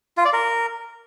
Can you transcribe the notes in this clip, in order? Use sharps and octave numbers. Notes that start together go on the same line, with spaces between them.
F4
D5
A#4